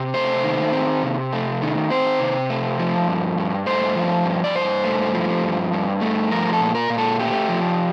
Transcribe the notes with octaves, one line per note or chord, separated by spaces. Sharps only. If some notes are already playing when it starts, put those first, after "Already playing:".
Already playing: C3 C4
A3 C5
D#3
C4
C3
A3
D#3
C4 C5
C3
A3
F3
G2
G2
A3 C5
F3
G2
D5
G2 C5
A3
F3
G2
G2
A3
F3 A#4
A4
A#2
A#4
A#2
A4
A3 G4
F3